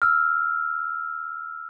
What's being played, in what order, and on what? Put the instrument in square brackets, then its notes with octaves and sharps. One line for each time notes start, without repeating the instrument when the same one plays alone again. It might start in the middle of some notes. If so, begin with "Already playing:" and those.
[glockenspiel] E6 F6